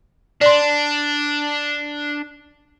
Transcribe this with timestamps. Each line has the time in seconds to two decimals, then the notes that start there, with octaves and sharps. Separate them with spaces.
0.41 D4 D5 C6